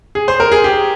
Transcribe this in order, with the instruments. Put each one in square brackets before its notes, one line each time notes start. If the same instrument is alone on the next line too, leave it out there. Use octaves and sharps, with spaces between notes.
[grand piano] G#4
C5
A#4
G#4
G4